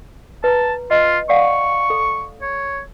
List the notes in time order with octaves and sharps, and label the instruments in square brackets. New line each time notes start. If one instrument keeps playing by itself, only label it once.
[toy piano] B4 A#5 [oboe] A5
[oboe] F4 [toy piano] D#5
[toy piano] D5 F5 F#5 [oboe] C#6
[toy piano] A4
[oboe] C#5